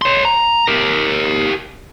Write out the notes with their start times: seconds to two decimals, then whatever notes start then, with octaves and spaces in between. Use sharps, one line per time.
0.02 C#5 C6
0.25 A#5
0.68 G4 A#4